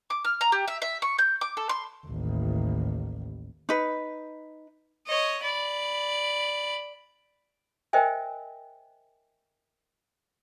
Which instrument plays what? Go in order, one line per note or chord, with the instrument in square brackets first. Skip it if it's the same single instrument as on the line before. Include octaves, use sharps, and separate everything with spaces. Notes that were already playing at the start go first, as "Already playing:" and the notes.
[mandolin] D6
F6
A#5
G4
E5
E5
C#6
G6
D6
A4
C6
[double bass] A1 D#2
[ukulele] D#4 B4
[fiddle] C#5 D#5
D5 B5
[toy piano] A#4 C5 D#5 E5 G5 G#5